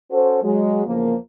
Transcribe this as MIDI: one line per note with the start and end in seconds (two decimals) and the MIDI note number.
0.11 0.41 61
0.11 0.41 66
0.11 0.41 69
0.11 0.41 72
0.42 0.83 54
0.42 0.83 56
0.86 1.15 40
0.86 1.15 49
0.86 1.15 53
0.86 1.15 58